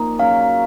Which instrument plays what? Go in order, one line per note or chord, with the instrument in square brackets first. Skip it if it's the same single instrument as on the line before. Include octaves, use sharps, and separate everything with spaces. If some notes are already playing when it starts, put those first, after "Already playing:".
Already playing: [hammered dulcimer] A#2 F3 A#3 D#4
[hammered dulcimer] C#3 F#3 C#4 [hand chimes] F5